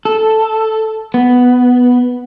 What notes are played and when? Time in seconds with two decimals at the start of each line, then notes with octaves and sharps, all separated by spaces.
0.05 A4
1.14 B3